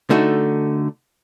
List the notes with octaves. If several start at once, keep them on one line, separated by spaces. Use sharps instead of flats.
D3 A3 D#4 F#4